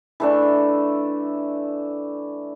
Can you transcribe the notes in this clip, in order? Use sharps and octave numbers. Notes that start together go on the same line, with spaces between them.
E3 A3 D4